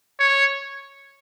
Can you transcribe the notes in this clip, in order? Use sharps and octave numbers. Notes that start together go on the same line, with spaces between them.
C#5